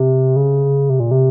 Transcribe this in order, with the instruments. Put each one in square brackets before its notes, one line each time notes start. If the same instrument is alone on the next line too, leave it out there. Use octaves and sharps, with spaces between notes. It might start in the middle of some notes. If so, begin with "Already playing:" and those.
Already playing: [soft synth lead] C3
C#3
C3
A#2
C3